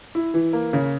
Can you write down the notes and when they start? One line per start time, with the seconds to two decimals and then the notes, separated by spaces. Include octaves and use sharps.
0.15 E4
0.34 E3
0.53 A#3
0.73 C#3